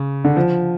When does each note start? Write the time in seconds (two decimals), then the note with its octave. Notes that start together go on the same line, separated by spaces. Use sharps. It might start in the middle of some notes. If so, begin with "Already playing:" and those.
Already playing: C#3
0.24 D3
0.36 F3